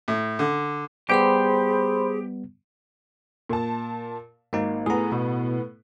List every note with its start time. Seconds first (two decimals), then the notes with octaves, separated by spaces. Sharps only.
0.08 A2
0.39 D3
1.10 G3 B3 G4 G#4 C5 B5 C6
3.49 A#2 A5
4.53 G#1 A#3 D#4
4.86 A2 B3 G#4 A#5
5.12 B2